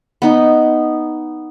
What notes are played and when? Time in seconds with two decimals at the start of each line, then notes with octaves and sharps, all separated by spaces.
0.22 B3 D#4